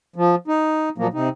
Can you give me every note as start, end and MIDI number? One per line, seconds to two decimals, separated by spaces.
0.16 0.35 53
0.48 0.89 63
0.98 1.07 46
0.98 1.07 53
0.98 1.07 54
0.98 1.07 58
1.13 1.29 48
1.13 1.29 63